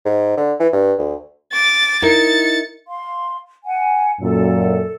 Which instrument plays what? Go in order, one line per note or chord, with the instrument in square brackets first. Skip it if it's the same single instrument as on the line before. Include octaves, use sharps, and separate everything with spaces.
[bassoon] G#2
D3
E3
G2
D2
[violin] D6 A6
[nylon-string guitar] D#4 E4 A#4 [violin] A6 C#7
[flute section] F5 C6
F#5 G#5
[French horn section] F#2 A#2 [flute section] A4